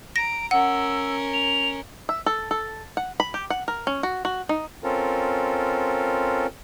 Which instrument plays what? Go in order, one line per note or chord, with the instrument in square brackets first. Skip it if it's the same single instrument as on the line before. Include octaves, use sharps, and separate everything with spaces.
[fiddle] A#5 [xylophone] A#6 [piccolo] D7
[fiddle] C#4 A#4 [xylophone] F#5 [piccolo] E6
[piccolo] F7
[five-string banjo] E5
A4
A4
F#5
B5
G4
F#5
A#4
C#4
F#4
F#4
D#4
[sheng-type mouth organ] C4 C#4 F4 A4 A#4